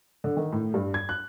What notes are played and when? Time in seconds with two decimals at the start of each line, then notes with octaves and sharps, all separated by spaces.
0.24 D3
0.37 D#3
0.52 A2
0.74 G2
0.94 G#6
1.09 F#6